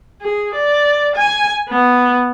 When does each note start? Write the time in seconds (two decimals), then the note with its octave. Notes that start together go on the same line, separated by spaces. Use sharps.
0.22 G#4
0.55 D5
1.16 G#5
1.69 B3